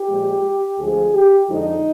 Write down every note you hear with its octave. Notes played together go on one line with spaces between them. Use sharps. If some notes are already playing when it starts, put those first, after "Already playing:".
Already playing: G4
A#2 F3 G#3
D2 D3 F3 G#3 G#4
G4
F2 D3 F3 G#3 D#4